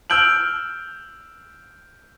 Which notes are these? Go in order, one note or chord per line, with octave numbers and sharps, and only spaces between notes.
E6 F6 G6 D7 F#7